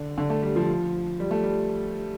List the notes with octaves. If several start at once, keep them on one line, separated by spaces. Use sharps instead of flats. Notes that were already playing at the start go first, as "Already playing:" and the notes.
Already playing: D3
D3
A3
G3
F3
G3
A3
G3